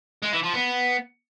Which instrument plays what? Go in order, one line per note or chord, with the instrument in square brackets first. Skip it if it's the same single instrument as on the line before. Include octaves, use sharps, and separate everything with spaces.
[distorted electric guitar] G#3
E3
F3
B3